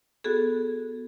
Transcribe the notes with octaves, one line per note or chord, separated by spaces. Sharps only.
B3 F#4 G#4 A4